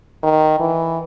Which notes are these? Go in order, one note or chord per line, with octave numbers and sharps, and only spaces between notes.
D#3
E3